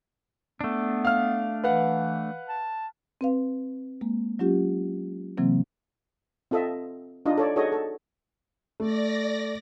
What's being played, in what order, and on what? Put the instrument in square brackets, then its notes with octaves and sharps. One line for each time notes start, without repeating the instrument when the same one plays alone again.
[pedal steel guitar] A3 D4 [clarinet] B3
[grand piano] F5 F6
[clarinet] E3 [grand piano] B4 F5 F#5
[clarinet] A5
[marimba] C4 B4 F5
G#3 A#3
F#3 C#4 F4 G4
C3 E3 F#3 A#3 C4
[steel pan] C4 F4 A4 D#5 E5
D4 D#4 F4 D#5
A4 C#5 D5
D#4 F#4 G#4 A4 C#5 D#5
A4
[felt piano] A3 [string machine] D5 A#6